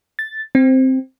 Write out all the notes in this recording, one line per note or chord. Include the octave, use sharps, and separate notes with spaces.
A6
C4